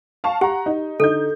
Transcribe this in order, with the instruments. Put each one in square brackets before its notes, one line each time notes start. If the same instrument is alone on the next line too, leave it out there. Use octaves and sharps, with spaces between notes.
[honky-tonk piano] F5 A5 C#6
[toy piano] G4 [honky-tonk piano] F#5 A#5
[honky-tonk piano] D#4
[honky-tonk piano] D3 D#4 G6 [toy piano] A4